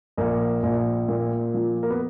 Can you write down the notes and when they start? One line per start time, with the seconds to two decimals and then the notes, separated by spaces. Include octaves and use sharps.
0.17 A#1 A#3
0.63 A#1
1.08 A#2
1.54 F3
1.83 A#3
1.90 B3